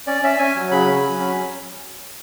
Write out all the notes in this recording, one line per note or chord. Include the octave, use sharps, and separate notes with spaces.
C#4 D5
C#4 E5
C#4 G#5
F#3
C#3 B5
C#4
F#3
C#4